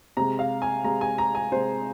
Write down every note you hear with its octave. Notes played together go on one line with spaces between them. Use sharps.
C3 G#3 A#5
F5
G#5
C3 G#3 A#5
G#5
A#5
G#5
C3 G#3 C5